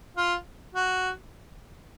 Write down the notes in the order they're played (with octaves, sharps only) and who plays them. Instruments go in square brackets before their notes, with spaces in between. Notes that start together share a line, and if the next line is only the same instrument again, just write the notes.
[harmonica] F4
F#4